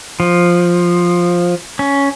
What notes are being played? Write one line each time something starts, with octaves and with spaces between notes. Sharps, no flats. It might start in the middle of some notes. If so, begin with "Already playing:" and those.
F3
C#4